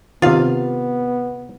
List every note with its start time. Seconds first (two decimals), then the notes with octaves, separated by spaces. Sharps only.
0.22 C3 D#3 B3 F4 F5